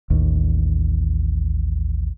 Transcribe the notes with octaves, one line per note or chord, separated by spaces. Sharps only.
A1 D#2